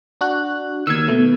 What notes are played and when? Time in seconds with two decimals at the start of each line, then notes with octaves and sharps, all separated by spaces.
0.21 D4 F#4 F#6
0.87 D#2 D#3 E6 G#6
1.08 B2 A3